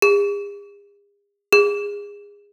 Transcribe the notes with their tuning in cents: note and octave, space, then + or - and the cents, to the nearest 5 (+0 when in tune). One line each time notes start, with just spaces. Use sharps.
G#4 -45
G#4 -25